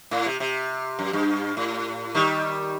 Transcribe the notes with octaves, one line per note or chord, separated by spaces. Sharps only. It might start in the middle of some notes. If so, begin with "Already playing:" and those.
A2
C3
C3
F#2
G2
A2
D#3 G3